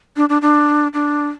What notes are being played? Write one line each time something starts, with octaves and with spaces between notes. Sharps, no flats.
D4
D4
D4
D4